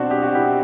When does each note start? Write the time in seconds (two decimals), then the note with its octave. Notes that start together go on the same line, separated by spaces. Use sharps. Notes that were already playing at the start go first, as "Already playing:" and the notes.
Already playing: B2 C4 D4 F#4
0.11 G4
0.23 F#4
0.35 E4 G4